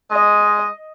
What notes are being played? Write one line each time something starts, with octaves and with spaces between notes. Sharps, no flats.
G#3 D#5